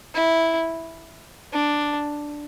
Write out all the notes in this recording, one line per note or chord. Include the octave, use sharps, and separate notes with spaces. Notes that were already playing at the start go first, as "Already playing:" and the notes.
E4
D4